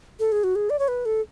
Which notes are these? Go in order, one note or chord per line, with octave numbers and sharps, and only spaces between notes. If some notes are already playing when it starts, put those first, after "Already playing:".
A4
G#4
F#4
G#4
D5
C#5
B4
A4